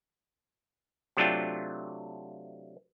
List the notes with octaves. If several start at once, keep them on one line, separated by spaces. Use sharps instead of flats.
C3 F#3 A3 D4 F4 G5